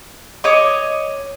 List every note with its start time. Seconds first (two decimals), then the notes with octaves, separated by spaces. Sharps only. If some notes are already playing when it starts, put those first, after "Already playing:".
0.44 C#5 D#5 D6